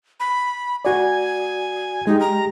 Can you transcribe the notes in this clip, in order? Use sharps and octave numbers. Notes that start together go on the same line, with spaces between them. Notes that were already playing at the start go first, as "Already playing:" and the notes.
B5
F#4 D5 G#5
G#3 D#4 G4
A#5